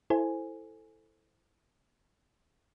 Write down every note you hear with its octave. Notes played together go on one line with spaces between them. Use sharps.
E4 A4 C5 G#5